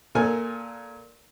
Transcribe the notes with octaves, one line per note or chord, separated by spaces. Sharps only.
A#2 A4 A#4 G#5